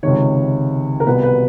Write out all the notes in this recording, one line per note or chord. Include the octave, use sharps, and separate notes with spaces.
C#2 C3 D#3 C#5
A#4
C2 B2 B4
B4